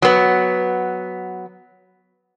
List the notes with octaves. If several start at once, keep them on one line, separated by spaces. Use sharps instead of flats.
F#3 B3